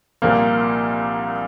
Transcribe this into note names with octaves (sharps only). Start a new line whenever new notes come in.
C2 A#2 F3 A#3 F6